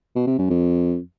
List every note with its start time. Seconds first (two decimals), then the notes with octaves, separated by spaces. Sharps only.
0.15 B2
0.27 C3
0.38 F#2
0.50 F2